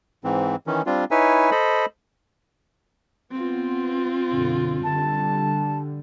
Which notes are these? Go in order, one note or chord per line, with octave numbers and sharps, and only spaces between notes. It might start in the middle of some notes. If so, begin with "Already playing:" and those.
G#2 E3 C4
D#3 E3 C#4
G3 C4 D4 F4
D#4 E4 B4 C#5 E5 G#5
A4 C5 D#5 B5
B3 C4 F4
F#2 B2 D3
D3 G3 A5